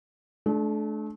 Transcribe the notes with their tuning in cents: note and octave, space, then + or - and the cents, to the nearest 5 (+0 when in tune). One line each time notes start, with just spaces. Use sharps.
A3 -35 D4 +0